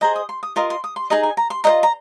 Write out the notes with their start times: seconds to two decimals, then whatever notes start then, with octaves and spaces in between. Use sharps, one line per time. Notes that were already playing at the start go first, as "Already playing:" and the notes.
0.01 G#4 C5 D#5 A#5
0.16 D#6
0.29 C6
0.43 D#6
0.56 F4 A#4 D#5 C6
0.70 C6
0.84 D#6
0.96 C6
1.10 D#4 G#4 D#5 A#5
1.23 G#5
1.37 A#5
1.50 C6
1.64 F4 C5 D#5 A#5
1.83 A#5